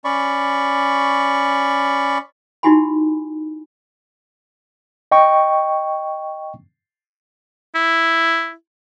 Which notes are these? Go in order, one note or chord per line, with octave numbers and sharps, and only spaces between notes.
C#4 D5 B5 C#6
D#4 E4 F#4 G4 G#5 B5
D#5 G5 C#6
E4